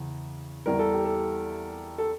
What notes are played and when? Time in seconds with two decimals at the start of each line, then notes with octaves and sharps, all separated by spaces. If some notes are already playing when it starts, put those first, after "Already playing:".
Already playing: E2 C#3
0.66 E2 E3 G3 A#4
0.79 A4
0.93 G4
1.05 A4
1.98 A4